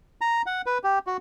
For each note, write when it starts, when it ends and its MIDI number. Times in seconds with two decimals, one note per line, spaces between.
0.21 0.42 82
0.46 0.62 78
0.66 0.78 71
0.84 0.99 67
1.07 1.17 66